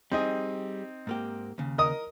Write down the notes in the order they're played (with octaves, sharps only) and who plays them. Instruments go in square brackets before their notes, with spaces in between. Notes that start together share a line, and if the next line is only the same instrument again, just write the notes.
[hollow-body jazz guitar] G3 G#4 [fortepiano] C4 D#4 D#5
[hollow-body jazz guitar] G#2 A#3 G4
D#2 C#3
[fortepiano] A#4 D#5 D#6